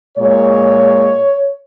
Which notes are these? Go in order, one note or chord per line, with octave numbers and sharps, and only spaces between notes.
A#2 G#3 C#5